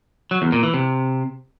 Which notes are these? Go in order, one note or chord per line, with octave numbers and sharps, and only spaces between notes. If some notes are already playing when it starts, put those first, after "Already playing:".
F#3
E2
A#2
E3
C3